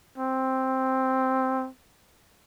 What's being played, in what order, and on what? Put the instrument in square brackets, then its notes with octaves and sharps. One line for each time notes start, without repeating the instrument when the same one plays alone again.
[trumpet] C4